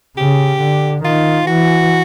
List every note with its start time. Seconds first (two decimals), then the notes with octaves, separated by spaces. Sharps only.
0.17 C#3 G4
0.61 D3
1.04 D#3 F4
1.47 E3 F#4